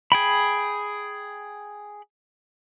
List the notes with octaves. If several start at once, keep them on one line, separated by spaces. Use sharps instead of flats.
G#4 G5 B5